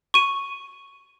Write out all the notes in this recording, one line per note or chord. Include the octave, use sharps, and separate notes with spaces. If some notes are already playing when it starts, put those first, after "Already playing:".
C#6 D#7